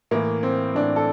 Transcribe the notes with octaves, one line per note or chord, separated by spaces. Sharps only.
A2 E3 A#3
C4
A2 E3 D4
A4